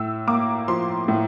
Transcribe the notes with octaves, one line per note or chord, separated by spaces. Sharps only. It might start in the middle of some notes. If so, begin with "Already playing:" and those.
Already playing: A2 E6
A#3 D6
F3 C6
A2